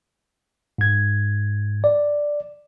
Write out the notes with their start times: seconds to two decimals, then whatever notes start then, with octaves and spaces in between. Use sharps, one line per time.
0.78 G#2 G#6
1.84 D5